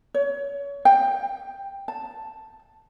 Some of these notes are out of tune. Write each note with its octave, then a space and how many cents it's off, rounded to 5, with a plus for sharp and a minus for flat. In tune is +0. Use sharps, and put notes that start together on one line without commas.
C#5 +30
G5 +10
A5 +0